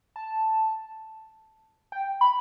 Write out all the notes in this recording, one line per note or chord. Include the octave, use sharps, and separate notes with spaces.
A5
G5
B5